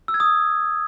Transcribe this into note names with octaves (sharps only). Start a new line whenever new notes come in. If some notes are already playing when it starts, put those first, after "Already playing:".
E6
G#6
D#6